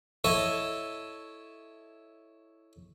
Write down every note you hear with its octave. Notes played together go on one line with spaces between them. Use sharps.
E4 A4 C#5 D#5